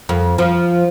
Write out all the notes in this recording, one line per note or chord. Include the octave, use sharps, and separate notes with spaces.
F2
F3